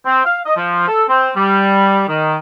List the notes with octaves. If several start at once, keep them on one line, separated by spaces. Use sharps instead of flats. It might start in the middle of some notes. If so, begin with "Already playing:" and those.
C4
F5
D#5
F3
A4
C4
G3
D#3